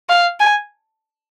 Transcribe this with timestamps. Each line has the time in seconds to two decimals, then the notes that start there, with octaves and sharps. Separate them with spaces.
0.09 F5
0.40 G#5